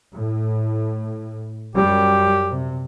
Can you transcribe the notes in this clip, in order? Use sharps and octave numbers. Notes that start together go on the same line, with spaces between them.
A2
F#2 G3 G4
C3